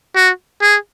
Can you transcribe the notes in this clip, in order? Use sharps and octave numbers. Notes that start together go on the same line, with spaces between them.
F#4
G#4